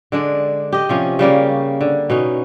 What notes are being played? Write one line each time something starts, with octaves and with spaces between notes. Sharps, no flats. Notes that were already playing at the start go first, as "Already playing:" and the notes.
D3 G#3 D4
G4 D#5
C3 F3 C#4
C#3 G3 A#3 C#4
D3
B2 C#4 D#4